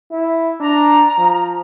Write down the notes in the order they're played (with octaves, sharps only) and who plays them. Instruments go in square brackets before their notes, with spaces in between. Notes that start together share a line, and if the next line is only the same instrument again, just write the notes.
[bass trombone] E4
[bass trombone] D4 [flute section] A#5
[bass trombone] F3